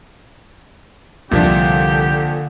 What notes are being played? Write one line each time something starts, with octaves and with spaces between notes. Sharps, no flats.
C2 A#2 D3 F3 D4 G4